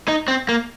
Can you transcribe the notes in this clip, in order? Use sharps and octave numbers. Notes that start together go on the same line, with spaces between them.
D#4
C4
A#3